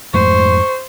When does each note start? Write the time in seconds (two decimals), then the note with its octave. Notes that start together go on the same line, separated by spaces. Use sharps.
0.14 F2 G#2 A3 C5 C#6